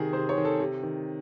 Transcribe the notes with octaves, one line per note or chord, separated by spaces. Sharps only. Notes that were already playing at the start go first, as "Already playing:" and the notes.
Already playing: C3 D#3 G#4
C3 C5
C#5
D#3
A4
C3
D#3